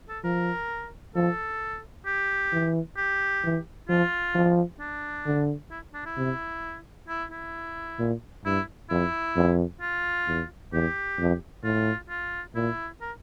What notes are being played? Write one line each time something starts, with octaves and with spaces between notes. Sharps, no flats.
A4
F3 A#4
F3 A4
G4
E3
G4
E3
F3 F4
F3
D4
D3
E4
D4
E4
C3
E4
E4
A#2
G2 E4
F2 E4
F2
F4
E2
E2 G4
F2
A2 F4
F4
A#2 E4
A#4